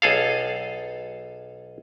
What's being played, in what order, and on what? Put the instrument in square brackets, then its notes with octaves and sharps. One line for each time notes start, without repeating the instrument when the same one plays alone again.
[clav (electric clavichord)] B1 G#4 A4 F5